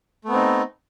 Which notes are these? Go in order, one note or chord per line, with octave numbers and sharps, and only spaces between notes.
A3 B3 C4 D#4